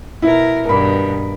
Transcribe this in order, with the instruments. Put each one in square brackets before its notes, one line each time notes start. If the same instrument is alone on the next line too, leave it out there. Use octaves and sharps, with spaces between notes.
[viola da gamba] B2 A#4 [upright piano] E4
[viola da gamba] G2 B2 D#3 [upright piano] A#4 B5